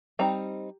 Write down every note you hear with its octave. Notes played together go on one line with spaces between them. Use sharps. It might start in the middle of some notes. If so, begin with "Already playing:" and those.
G3 C4 D#4 A#5